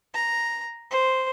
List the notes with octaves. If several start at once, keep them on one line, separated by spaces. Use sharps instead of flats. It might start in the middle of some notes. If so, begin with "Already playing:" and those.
A#5
C5